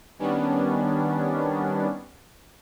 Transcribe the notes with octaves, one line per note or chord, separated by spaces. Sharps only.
D#3 G3 B3 C#4 D4